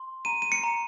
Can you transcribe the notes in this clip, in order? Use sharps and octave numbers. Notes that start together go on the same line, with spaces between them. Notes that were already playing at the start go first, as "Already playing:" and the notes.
Already playing: C6
A#5 D#7
D#7
C#7
A#5